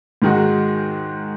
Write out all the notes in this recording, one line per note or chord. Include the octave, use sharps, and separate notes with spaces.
G#2 D#3 G#3 D#4 F#4